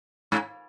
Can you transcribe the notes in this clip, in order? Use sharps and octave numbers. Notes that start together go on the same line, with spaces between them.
G#2